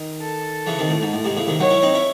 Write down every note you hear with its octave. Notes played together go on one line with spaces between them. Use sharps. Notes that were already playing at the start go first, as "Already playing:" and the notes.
Already playing: D#3
A4
C#3 E3
C3 D#3
A2
G#2
A2
G#2 C3
A2 C#3
C3 D#3
D#3 F#3 C#5
C#4 E4
C4 D#4
C#4 E4